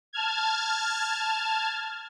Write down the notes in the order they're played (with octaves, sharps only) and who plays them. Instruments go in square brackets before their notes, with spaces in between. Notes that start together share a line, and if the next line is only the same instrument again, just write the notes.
[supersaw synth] A5 F6 G#6